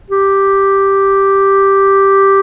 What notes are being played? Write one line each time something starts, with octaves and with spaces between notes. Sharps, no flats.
G4